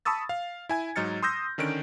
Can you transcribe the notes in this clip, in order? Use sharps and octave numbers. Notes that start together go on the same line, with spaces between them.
A5 B5 C#6 D#6 E6 A6
F5
E4 G#5 G#6
G#2 F#3 D#4 F6 A6 C#7
C6 D#6 E6 G6 A#6
D3 D#3 C#4 D4 D7